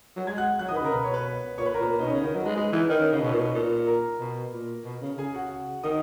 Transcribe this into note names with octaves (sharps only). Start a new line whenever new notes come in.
F#3
G#3 G#5 G#6
F#5 F#6
F#3 F#5 F#6
D#3 D#5 D#6
B4 B5
C#3
A#4 A#5
B2 B4 B5
C#5 C#6
B4 B5
A#2 C#5 C#6
B4 B5
A#4 A#5
A#2
B4 B5
A#2
B2 D#4 D#5
C#4 C#5
C#3
D#3 D#4 D#5
F#3
G#3 B4
G#3 B4
E3
D#3 B4
C#4 C#5
C#3 D#4 D#5
B2
A#2
B2
A#2
A#4 A#5
B2
A#2
B2
C#3
C#3 G#4 G#5
F#4 F#5
D#3 D#5 D#6